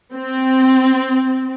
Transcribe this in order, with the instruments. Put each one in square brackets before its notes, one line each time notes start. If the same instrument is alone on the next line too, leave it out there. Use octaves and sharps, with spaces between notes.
[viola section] C4